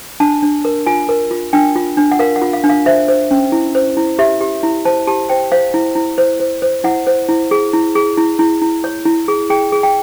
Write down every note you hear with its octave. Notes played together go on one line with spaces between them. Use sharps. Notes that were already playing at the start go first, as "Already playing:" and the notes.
D4 A5
D4
A#4
F4 G#5
A#4
F4
D4 G5
F4
D4
F#5
A#4 F5
F#5
F4
F5
D4
F5
C5 E5
C5
C#4
E4
C5
E4
G4 E5
G4
E4
C5 A5
G4 A5
C5 G5
C5 F5
E4
E4
C5
C5
C5
E4 F#5
C5
E4
G#4
E4
G#4
E4
E4
E4
C#5
E4
G#4
G#4 G5
G#4
G5